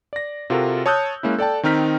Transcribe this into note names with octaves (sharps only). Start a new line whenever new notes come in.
D5 A#6
C3 F4 F#4 A4 A#4
C#5 A5 D#6 E6 F#6 G6
G#3 A#3 C#4 E4
A4 D5 G5 A5
D#3 C4 D#4 F6 B6